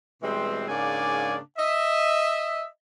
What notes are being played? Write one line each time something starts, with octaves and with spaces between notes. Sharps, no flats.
B2 E3 G3 G#3 C4
G#2 C#3 A#3 D4 D5 G#5
D#5 E5